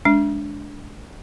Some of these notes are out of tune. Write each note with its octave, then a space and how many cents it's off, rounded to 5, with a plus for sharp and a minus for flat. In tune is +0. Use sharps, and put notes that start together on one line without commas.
G#3 +20 D4 -20